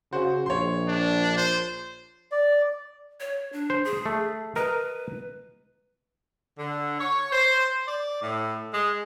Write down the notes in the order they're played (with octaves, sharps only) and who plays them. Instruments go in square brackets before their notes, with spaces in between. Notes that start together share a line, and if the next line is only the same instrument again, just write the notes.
[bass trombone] C#3 [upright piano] F#4 C5
[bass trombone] A#1 [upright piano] C#5 C6
[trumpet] D4
C5
[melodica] D5
[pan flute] C#5
D4
[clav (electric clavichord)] C5
[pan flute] G#4
[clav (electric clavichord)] A3
[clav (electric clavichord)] A#4 D#5 [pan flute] B4
[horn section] D3
C#5
C5
D5
A2
G#3